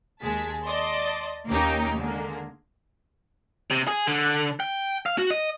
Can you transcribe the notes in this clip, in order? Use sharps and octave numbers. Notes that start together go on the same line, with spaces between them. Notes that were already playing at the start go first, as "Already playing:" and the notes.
D#2 G#3 G#4 A5 B6
D5 D#5 A5 C6
D#2 A#3 C#4 D#4 G4 G5
D3 G#3 A#3
C3
G#4
D3
G5
F5
F#4
D#5